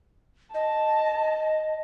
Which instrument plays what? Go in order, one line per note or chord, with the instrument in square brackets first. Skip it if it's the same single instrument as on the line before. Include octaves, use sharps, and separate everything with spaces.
[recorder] D#5 [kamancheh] A5